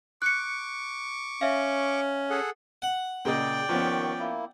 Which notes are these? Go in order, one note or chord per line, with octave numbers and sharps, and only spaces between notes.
C#6 D6 F#6 C#7
C#4 E5 F5
G#4 A4 F#5
F#5
A#2 C#3 D5 D#5 G5
D#2 D#3 F3 B3 C#4 C#6
A#3 E4